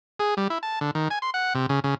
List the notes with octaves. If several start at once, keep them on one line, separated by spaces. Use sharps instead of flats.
G#4
G3
E4
A5
D3
D#3
G#5
C6
F#5
C3
C#3
C#3